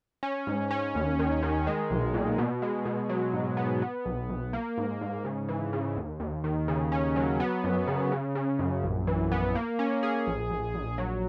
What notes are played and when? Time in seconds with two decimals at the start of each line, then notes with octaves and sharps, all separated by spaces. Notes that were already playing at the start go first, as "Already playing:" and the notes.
0.23 C#4
0.47 G#2
0.71 C#4
0.95 D#2
1.19 D#3
1.43 D#3
1.67 G#3
1.91 B1
2.14 A#2
2.38 B2
2.62 G#3
2.85 B2
3.09 F#3
3.33 G#2
3.57 B3
3.82 B3
4.05 B1
4.29 B1
4.53 A#3
4.78 G#2
5.01 G#2
5.25 C#3
5.49 E3
5.73 C#3
5.97 D#2
6.20 D#2
6.44 D#3
6.68 C#3
6.92 C#4
7.16 F#3
7.40 B3
7.64 F#2
7.87 C#3
8.12 C#3
8.35 C#3
8.59 F#2
8.83 A#1
9.07 E3
9.32 B3
9.55 A#3
9.79 C#4
10.03 G#4
10.27 A#1
10.50 A#1
10.75 A#1
10.98 F#3